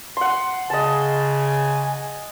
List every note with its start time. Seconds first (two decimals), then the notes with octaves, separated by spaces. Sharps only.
0.17 F#5 C6
0.70 C#3 D#5 G#5 A5